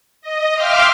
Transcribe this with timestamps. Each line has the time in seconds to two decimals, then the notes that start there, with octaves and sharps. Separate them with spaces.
0.22 D#5
0.54 E5 F5 G5 C6 D6 F6